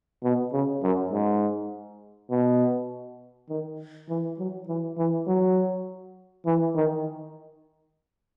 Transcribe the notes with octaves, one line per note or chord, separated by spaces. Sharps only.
B2
C#3
F#2
G#2
B2
D#3
E3
F#3
E3
E3
F#3
E3
D#3